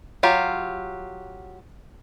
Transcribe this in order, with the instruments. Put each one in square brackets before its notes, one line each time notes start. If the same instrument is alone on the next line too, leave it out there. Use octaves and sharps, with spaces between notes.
[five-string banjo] F#3 F4 G4